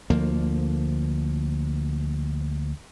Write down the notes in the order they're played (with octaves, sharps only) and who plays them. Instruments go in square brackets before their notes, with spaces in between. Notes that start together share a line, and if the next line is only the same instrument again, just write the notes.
[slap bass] D2 F3 A#3